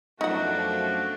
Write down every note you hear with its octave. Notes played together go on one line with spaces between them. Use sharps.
F#2 B2 F3 A3 D4 D#4 F#4 F#5